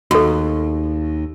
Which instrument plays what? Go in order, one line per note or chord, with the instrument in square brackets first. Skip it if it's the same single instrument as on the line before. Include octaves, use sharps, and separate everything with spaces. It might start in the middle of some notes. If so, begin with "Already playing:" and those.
[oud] D#2 [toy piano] F#4 A4